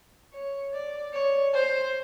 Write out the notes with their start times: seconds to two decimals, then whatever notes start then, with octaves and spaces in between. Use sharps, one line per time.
0.33 C#5
0.73 D5
1.13 C#5
1.54 C5